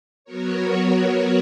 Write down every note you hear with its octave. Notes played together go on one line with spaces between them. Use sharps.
F#3 B3 F#4 A#4 C#5